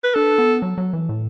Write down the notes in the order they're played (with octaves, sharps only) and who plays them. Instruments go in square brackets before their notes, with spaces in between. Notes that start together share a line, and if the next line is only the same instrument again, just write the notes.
[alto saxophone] B4
[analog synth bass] D4 [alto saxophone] A4
[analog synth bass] B3
F#3
F#3
E3
A2